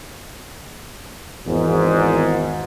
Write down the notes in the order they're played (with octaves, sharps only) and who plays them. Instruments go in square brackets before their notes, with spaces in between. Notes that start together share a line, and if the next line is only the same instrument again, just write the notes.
[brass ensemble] G#1 E2 G#2